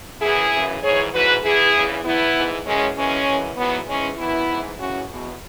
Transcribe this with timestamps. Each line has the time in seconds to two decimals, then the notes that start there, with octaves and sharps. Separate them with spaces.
0.22 F#2 E3 E4 G#4
0.52 F#2 C#3 E3
0.83 G#2 E3 G#4 C#5
1.13 G#2 E3 F#4 B4
1.44 E2 E3 E4 G#4
1.74 E2 C#3 E3
2.04 E2 E3 B3 E4
2.35 G#2 E3
2.65 F#2 C#3 E3 G#3 C#4
2.96 F#2 E3 G#3 C#4
3.27 F#2 E3
3.57 G#2 E3 F#3 B3
3.88 G#2 E3 G#3 C#4
4.18 F#2 E3 B3 E4
4.48 G#2 E3
4.79 F#2 C#3 E3 C#4 F#4
5.10 E2 B2